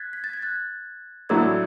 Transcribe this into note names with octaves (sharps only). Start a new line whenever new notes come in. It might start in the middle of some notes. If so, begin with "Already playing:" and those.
Already playing: F#6 G#6 A6 B6
B6
A6
G#6
F#6 A6
A2 F#3 A3 D4 E6 G#6